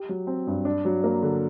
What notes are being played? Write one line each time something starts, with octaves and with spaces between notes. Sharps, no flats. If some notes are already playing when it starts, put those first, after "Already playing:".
Already playing: G4
F#3
C4
G2
D4
F#3
A#3
D3